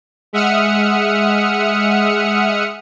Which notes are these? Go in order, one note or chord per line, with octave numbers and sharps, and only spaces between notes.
G#3 E5 F#5 D#6 F6 C#7